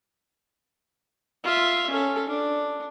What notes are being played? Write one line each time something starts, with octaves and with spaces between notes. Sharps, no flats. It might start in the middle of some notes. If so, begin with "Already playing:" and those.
F4 E5
C#4 A4
D4